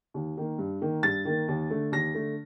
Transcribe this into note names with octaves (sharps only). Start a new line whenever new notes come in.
D#2
D#3 A#3
G2
D#3 A#3
G2 A6
D#3 A#3
D#2
D3 A3
D#2 A#6
D3 A3